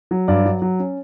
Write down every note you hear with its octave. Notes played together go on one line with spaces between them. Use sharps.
F#3
G2 D5
F#3
F#3
C#4